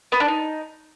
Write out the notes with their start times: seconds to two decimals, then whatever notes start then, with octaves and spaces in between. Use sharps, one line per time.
0.12 B3
0.20 D4
0.28 D#4